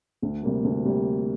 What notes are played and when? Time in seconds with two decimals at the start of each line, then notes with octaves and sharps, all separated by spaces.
0.22 D2
0.43 C3 G3 A#3
0.64 D2
0.84 C3 G3 A#3